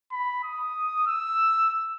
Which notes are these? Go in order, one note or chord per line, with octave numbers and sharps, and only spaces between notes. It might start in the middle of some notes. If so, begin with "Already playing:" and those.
B5
D#6
E6